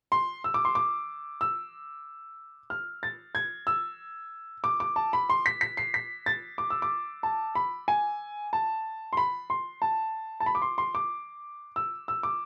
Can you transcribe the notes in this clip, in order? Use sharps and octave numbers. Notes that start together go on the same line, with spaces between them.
C6
E6
D6
C6
D6
E6
F6
A6
G#6
E6
D6
D6
A5
B5
C6
B6
B6
C7
B6
A6
D6
E6
D6
A5
B5
G#5
A5
C6
B5
C6
A5
A5
B5
D6
C6
C6
D6
E6
E6
D6